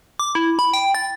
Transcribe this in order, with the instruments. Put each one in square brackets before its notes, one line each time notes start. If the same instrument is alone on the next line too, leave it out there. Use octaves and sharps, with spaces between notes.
[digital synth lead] D6
E4
B5
G5
A6